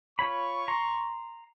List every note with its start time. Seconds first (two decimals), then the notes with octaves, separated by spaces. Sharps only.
0.19 F4 C#5 B5 C#6
0.68 A#5 C6